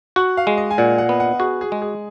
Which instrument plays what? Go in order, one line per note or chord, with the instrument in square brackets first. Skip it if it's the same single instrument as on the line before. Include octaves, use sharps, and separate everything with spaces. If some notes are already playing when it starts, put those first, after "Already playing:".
[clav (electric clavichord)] F#4 [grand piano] F#5
[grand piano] F5
[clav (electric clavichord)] G#3
[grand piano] D#5
G#5
[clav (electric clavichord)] A#2 [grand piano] F#5
[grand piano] F#5
[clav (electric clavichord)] B3
[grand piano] F#5
[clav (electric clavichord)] F#4 [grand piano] G#4
[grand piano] G#4
[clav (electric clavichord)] G#3
[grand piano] G#4